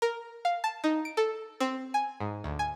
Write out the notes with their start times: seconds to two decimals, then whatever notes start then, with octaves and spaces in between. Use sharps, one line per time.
0.02 A#4
0.45 F5
0.64 A5
0.84 D#4
1.05 D7
1.17 A4
1.60 C4
1.94 G#5
2.20 G#2
2.44 D2
2.59 G#5